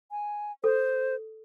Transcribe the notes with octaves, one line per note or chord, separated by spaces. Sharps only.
G#5
A4 C5